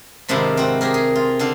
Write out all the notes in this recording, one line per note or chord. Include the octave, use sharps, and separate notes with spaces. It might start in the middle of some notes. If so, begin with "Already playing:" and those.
G#2 C3 D#3 F3 D4 E4
C4 F#4
G4 G#4 A#4
G#4
F4
D3 D4 F5